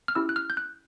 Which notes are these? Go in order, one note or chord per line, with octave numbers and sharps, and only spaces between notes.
F6
C#4 E4 G4 E6
F#6
F6
G6
F#6